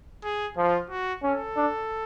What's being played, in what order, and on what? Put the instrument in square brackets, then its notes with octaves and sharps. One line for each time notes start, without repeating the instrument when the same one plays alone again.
[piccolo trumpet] G#4
[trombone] F3 [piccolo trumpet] F4
[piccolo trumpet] F#4
[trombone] C#4 [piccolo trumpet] A4
[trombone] D4